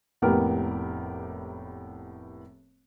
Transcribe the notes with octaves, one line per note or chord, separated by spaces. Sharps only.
F1 A2 A#3 B3 G4 A#4